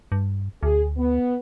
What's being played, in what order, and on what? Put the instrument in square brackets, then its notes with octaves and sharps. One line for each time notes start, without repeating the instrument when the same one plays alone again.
[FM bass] G2
[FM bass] D2 [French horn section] G#4
[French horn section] B3